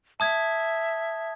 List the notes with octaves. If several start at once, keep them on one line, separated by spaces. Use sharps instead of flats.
E5 A5 D#6 G#6